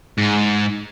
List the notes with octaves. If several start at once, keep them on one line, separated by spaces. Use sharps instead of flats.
G#2